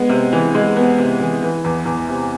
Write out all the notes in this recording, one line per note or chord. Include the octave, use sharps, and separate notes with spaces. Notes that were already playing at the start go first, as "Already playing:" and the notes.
Already playing: G#3 B3
C3
E3
G#3
B3
C3
E3
E3
E2
E2
C3